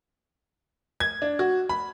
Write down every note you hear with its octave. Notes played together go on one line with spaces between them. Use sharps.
G#6
D4
F#4
B5